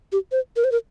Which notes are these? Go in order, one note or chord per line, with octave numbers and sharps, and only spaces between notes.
G4
C5
A#4
C5
A#4